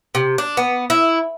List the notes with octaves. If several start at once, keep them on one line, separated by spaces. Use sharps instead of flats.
C3
D4
B3
E4